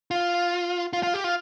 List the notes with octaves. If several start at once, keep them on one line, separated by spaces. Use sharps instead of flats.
F4
F4
F4
G4
F4